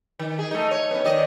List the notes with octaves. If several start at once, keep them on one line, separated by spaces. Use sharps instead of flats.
D#3
G#4
A3 D#4
C#5
B3 C#4
D#3 D5 D#5